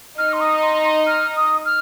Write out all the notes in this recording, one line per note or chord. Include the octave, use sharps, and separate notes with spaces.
D#4 D#5 F6
C6
D#6
C6
C6
F6
D#6
F6